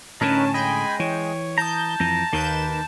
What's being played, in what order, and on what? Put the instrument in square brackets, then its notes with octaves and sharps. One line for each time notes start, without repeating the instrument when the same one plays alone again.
[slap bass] A2 D3 [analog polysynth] C#4 [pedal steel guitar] D#4 A#4 B4 [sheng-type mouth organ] A5
[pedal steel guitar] G#3 D#5 [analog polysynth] G5 [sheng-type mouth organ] G#5 B5
[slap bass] E3 [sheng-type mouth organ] C#5
[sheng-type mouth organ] A5 [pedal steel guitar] A#5 D#6 [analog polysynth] G6
[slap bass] F2 E3 [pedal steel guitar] A#5
[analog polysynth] D#2 G6 E7 [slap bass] D#3 [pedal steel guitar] A#3 A#4 B4